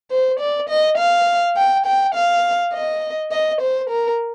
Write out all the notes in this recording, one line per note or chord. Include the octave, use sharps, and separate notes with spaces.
C5
D5
D#5
F5
G5
G5
F5
D#5
D#5
C5
A#4